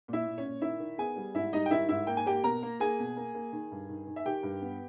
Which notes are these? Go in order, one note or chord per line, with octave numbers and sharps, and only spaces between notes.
A#2 E4 E5
A#2
C#4 C#5
A#2
D#3 E4 E5
D#3
B3 G#4 G#5
G3
G#2 E4 E5
G3 D#4 D#5
G5
D#3 E4 E5
G#2 E4 E5
A#3 G5
G#5
A#3 G4 G5
B2 A#4 A#5
A#3
A#3 G#4 G#5
B2
A#3
A#3
D#3
G2
D#3
D#3
E5
D#3 G4 G5
G2
B3